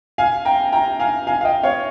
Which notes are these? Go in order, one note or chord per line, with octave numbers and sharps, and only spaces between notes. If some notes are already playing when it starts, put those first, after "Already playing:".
F5 G#5
G5 A#5
G5 A#5
F5 G#5
F5 G#5
F5
D#5 G5
C#5 F5